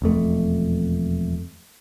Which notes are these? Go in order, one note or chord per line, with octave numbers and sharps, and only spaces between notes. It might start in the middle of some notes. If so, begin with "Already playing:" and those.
E1 F2 A3